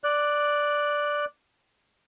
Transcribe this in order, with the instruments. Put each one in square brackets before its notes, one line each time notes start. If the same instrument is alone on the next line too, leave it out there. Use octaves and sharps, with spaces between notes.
[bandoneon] D5 F#6